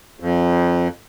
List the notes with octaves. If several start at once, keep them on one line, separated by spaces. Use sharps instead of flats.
F2